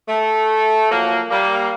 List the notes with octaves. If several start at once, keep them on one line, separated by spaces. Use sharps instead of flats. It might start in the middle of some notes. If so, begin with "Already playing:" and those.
A3
F3 F#3 A#3
G3 A#3